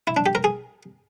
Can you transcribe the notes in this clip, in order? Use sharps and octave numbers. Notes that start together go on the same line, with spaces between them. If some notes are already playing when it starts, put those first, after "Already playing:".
E4
D4
G4
A#4
G#4